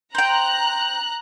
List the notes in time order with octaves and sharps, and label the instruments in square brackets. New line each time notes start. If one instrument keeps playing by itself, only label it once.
[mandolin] C5 G5 [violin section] A#5 F#6